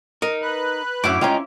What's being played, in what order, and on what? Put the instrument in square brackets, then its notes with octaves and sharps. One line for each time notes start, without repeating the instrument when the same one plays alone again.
[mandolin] D#4 [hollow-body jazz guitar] A#4
[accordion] B4 F#6
[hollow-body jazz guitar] F#2 F#5 [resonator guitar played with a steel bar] A2 C#4 [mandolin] E4 D6
[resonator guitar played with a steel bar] G#3 G5 A#5 [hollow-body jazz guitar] C#4 F4